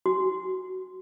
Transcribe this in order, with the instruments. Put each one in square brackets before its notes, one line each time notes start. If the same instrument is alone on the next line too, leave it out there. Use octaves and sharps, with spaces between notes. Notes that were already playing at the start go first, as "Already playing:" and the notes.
[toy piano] F#4